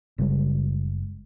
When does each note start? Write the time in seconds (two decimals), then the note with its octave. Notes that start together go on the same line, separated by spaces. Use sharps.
0.18 F#1 C#3 G3 G#3